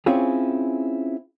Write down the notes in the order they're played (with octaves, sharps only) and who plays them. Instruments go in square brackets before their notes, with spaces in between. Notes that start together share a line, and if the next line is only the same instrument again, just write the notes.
[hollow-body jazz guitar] C4 C#4 E4 F4 G#4